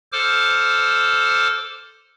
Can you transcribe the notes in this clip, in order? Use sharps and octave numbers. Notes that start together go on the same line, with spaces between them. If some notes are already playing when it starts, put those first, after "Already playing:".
A4 C5 D6 F6